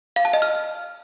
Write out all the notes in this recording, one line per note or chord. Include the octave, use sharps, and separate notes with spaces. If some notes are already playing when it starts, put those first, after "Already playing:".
F5
A5
D#5
F6